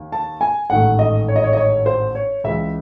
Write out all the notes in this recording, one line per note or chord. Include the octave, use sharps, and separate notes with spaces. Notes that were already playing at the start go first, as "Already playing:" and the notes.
Already playing: D#2
A5
G#5
A1 G#2 D#3 A3 F#5
D#5
C#5
D#5
C#5
D#5
C#5
C5
C#5
C#2 C#3 E3 G#3 E5